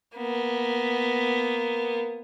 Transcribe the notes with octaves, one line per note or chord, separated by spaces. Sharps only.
A#3 B3